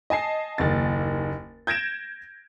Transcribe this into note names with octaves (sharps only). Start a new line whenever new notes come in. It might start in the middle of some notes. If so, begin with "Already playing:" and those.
D#5 G#5 A5 C7
F#1 D#2 A6
G6 G#6 A#6 D7 E7